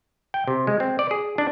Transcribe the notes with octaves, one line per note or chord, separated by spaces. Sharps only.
G5
C3
G#3
C4
D5
G#4
D4